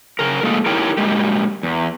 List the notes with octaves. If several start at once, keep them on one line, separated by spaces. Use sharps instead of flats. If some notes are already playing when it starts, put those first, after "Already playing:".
C#3 A#4
A2 G#3 A#3 G#4 A4
D#4 E4 G4 A#4 C#5 G5
A#2 G3 G#3 G4
E2